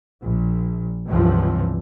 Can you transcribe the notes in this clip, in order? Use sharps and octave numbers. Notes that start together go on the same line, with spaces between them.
A#1
C#2 G2 C3 E3 F3